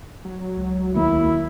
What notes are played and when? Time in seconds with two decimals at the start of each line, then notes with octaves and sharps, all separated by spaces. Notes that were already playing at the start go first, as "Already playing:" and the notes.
0.25 F#3
0.57 C#2
0.95 D#2 A#3 E4